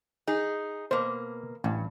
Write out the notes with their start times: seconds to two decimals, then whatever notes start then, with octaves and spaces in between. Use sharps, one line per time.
0.27 D#4 G#4
0.91 B2 A#3 C5
1.64 A1 G2